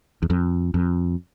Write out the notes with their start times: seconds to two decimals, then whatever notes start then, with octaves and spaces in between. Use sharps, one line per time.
0.22 E2
0.30 F2
0.74 F2